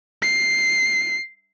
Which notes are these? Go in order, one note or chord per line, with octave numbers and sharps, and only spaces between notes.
C7